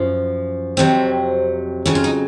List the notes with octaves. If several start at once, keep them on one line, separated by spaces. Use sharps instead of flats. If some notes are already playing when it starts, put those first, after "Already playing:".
Already playing: F#2 F3
F2 C3 F#3 C4
F2 C#3 F#3 C#4
F4
D#4